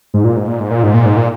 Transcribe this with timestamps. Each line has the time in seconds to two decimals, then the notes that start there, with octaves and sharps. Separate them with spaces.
0.14 G#2
0.24 A#2
0.36 G#2
0.48 A#2
0.60 G#2
0.71 A#2
0.83 G#2
0.94 A#2
1.06 G#2
1.17 A#2